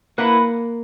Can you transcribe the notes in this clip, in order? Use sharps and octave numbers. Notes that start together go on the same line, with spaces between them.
A#3 E4 B4 F#5